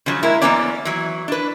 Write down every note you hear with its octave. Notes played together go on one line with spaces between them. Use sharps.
C#3 F3 F#3
G#3 A#3 E4 A#4
F2 F3 A#3 B3 C#4 D5
E3 F#3
D4 B4